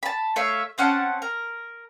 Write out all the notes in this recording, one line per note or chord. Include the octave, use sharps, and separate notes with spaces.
A5 B5
A3 C#5 E5 F5
C4 C#4 F#5 A5
A#4